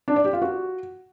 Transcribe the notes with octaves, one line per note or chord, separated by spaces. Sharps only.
D4
D5
G4
F4
F#4